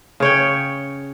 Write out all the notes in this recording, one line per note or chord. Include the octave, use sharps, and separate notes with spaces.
C#3 C#5 G5